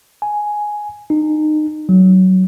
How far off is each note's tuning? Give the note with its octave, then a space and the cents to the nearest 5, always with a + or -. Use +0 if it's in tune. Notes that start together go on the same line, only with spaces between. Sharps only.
G#5 +5
D#4 -25
F#3 +15